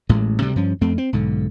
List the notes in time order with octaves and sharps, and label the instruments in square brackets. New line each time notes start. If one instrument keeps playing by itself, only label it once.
[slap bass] A1 A2 G#3
D2 C3 G3
G2 F3 C#4
F2 A3 C4
C4
B1 G#2 D3